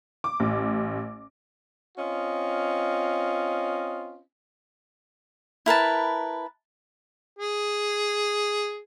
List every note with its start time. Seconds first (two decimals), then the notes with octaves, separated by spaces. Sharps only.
0.24 D6
0.40 A1
1.98 C4 C#4 F4 D#5
5.66 E4 A#4 B4 A5
7.39 G#4